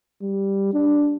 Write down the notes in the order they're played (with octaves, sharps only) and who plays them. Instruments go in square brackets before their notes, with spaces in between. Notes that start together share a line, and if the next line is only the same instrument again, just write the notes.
[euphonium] G3
D4